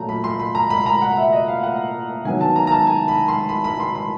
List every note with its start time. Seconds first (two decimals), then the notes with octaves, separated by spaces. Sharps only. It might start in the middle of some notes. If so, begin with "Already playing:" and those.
Already playing: A#2 F#3 A3 A#5
0.09 B5
0.24 C6
0.40 B5
0.55 A#5
0.70 B5
0.86 A#5
1.02 F#5
1.17 E5
1.33 D#5
1.48 F5
1.63 F#5
2.25 D#3 F#3 B3 G#5
2.41 A5
2.56 A#5
2.67 A#5
2.72 A5
2.87 G#5
3.08 B5
3.28 C6
3.49 B5
3.64 B5
3.80 C6
3.95 B5